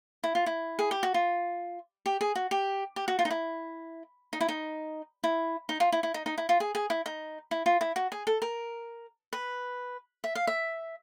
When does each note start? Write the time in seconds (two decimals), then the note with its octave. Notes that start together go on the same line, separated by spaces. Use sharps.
0.24 E4
0.35 F4
0.46 E4
0.79 G#4
0.91 G4
1.03 F#4
1.14 F4
2.06 G4
2.21 G#4
2.35 F#4
2.51 G4
2.96 G4
3.08 F#4
3.19 F4
3.25 D#4
3.31 E4
4.33 D#4
4.41 E4
4.49 D#4
5.24 E4
5.69 D#4
5.80 F4
5.92 E4
6.03 E4
6.14 D#4
6.26 D#4
6.38 E4
6.49 F4
6.60 G#4
6.75 G#4
6.90 E4
7.06 D#4
7.51 E4
7.66 F4
7.81 E4
7.96 F#4
8.12 G#4
8.27 A4
8.42 A#4
9.33 B4
10.24 E5
10.35 F5
10.47 E5